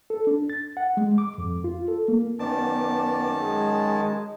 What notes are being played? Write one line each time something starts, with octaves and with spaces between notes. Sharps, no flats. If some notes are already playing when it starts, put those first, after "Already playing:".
A4
D4
A6
F#5
G#3
D6
F2
F4
A4
A#3
F#2 D#3 B3 D5 A5
G#3 G#4